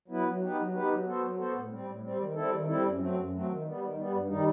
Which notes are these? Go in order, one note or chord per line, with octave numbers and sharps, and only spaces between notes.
F#3 B3 E4 B4
F#3
B3 D#4 G4 B4
F#3
B3 D#4 G4 B4
F#3
B3 F#4 A4 C5
F#3
B3 F#4 A4 C5
A2
G3 C4
A2
G3 C4
D#3
G3 C4 E4 A4
D#3
G3 C4 E4 A4
F#2
F#3 A3 C4
F#2
F#3 A3 C4
D#3
G3 B3
D#3
G3 B3
G2
D#3 G3 D#4